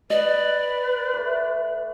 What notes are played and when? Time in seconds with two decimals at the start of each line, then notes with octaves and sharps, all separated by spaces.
0.10 B4 D5 D#5
1.14 A3 D6